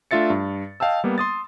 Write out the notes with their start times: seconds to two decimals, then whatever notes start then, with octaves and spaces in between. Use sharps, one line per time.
0.11 A3 D4 F4 E5 A6 C#7
0.30 G2
0.80 D#5 F5 G5 A5 E6
1.04 G3 A#3 B3
1.18 C6 D#6 A6